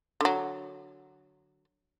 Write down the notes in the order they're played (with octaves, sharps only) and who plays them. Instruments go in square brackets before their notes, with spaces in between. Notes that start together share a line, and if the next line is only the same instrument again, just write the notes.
[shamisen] D3 F#3